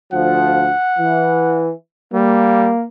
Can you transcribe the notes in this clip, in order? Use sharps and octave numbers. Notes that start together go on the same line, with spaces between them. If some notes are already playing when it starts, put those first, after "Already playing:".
D2 F3 F#5
E3
G3 A#3